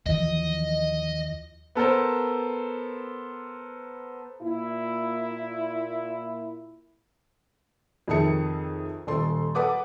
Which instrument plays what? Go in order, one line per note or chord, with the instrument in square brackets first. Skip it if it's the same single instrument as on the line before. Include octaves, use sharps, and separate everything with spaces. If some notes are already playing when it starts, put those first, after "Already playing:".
[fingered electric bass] D#2 E3 F3 [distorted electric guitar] D#5
[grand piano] B3 A4 A#4 C5
[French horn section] A#2 E4
[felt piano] F2 C3 D#3 G#4 A5 C#7
D#1 A4 C6
A4 B4 F#5 D6 D#6